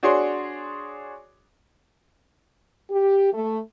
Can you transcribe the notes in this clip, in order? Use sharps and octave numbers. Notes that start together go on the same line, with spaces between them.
D4 F#4 G#4 C#5 D5 C6
G4
A3